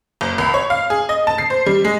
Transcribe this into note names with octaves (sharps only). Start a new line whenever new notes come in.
F#1
C2
C#5
F5
G#4
D#5
A5
C7
C5
G3
G#3